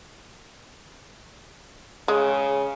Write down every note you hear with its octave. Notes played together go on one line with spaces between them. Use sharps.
C#3 G#3